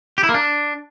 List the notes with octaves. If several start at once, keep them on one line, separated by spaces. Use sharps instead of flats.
G4
E4
A#3
D4